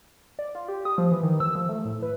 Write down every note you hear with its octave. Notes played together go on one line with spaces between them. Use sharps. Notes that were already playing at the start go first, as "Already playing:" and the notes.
D5
F4
G4
D#6
F3
E3
D#3
E6
F3
A3
A2
B4